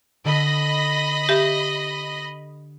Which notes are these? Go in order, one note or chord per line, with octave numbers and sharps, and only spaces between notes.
D3 A4 D#5 B5 A#6 D#7
G4 E5